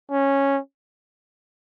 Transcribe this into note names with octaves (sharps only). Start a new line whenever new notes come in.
C#4